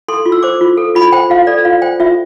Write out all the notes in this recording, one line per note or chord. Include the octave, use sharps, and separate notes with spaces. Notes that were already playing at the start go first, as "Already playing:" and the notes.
A4 C6
F4
E6
C5 D6
F4
A4
F4 B5
C5 G5
F4 F5
A4 D5
F4 F5
C5 G5
F4 E5